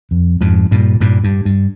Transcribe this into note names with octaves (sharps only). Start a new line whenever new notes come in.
F2
F2 G#2
G2 A#2
G2 A#2
G2
G2